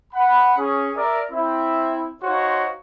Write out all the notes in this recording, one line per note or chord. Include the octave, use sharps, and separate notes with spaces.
F#5 B5
C#4 G#4
A#4 D5 E5
C4 E4 E5
D#4 F#4 C5 C#5 F5 C6